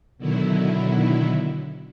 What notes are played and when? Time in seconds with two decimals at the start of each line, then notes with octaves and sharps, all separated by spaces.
0.18 B2 D3 D#3 F#3 E4